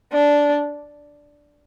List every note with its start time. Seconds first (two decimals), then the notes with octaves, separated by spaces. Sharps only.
0.12 D4